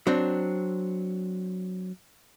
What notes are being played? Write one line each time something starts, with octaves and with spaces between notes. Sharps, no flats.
F#3 C4 D4